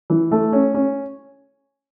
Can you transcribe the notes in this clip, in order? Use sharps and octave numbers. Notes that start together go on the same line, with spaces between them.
E3
A3
C#4
C#4